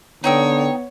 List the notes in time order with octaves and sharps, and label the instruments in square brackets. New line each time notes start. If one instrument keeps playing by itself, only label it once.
[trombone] D3 [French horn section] B3 [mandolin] D#4 G5 E6 [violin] C#5